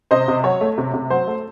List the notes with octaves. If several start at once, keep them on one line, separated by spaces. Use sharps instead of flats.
C3 C5 D#5
C3
F#3 C#5
A3
C3
C3
F#3 C5
A3